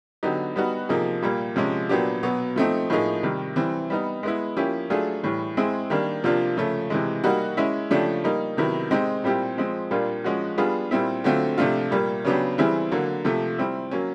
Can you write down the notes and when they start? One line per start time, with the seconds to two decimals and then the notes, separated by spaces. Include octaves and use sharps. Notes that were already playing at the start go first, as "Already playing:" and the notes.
0.23 D3 F#3 B3 D#4 G4
0.56 G3 B3 D#4 F#4
0.89 C3 F3 A#3 D#4 G#4
1.22 A#2 G3 A#3
1.56 C3 F3 G#3 C#4
1.89 A#2 F#3 B3 D4 G4
2.23 B2 F#3 B3
2.56 F3 A3 C4 D#4
2.90 A2 F3 A#3 D#4 G#4
3.23 C3 D#3 G3
3.56 E3 G3 C4
3.90 G3 B3 D#4
4.23 G#3 B3 E4
4.57 F3 A#3 C#4 E4 G4
4.90 F#3 A3 D4 F4 G#4
5.23 A2 E3 G3
5.57 G#3 C4 E4 G#4
5.90 D#3 G3 A#3 D4
6.24 C3 F3 A#3 D4 F4
6.57 C#3 F3 A3
6.90 C3 E3 G#3
7.24 G3 A#3 D#4 F#4
7.57 G#3 C#4 E4
7.91 C#3 F3 A3 D4 G4
8.24 G3 A#3 D#4
8.57 C3 D#3 F#3 B3 E4
8.91 G#3 C4 D#4 G4
9.24 A#2 G3 C4 E4 G4
9.58 F3 G#3 C4
9.91 A#2 G3 A#3 D4 F4
10.24 F3 G#3 C#4 F#4
10.58 G3 B3 D4 F4 G#4
10.91 A#2 G3 C4 E4
11.24 D3 F#3 A3 C4 F4
11.58 C3 F3 A3 D4 F4
11.91 A#2 G3 A#3
12.25 C#3 F#3 B3 D4 G4
12.58 E3 G3 C4 E4 G#4
12.92 D3 F#3 A#3
13.25 C3 F3 A3
13.58 G3 C4 E4
13.91 F#3 A#3 C#4